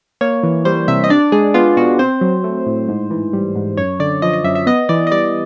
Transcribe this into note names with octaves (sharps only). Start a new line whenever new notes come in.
A#3 C#5
E3
G3 C5
C3 E5
D#5
D4 D5
G#3 G#4
B3 F4
B2 F#4
C4 C5
F#3
A3
A2
G#2
E3
G3
G#2
F#2 C#5
D3 D5
F3 D#5
D#5
F#2 E5
E5
B3 D#5
E3 D5
D#5
G3 D5